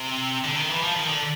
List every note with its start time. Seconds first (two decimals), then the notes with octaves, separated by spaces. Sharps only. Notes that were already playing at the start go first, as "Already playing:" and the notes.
Already playing: C3
0.44 D3
0.57 D#3
0.70 E3
0.83 F3
0.96 D#3
1.08 D3